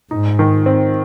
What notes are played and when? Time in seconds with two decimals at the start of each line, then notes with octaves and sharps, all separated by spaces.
0.11 G#2 D#4
0.39 D#3
0.66 C4